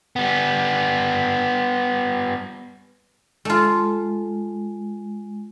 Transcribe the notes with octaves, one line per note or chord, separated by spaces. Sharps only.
G3 B3
G#3 A3 F4